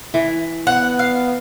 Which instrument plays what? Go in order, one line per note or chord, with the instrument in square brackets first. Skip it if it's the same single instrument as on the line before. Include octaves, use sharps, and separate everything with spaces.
[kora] E3
[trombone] B3 [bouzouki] F#5
[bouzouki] F5